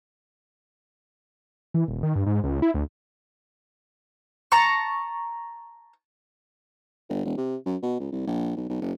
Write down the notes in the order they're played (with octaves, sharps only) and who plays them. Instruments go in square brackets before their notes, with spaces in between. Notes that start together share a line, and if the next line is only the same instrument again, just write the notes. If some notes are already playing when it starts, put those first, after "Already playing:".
[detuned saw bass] E3
D#1
D#3
G2
G#2
C#2
E4
D2
[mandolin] A5 A#5 C#6
[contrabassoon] G1
E1
C3
F#2
B2
C#2
C2
A#1
B1
B1
F#1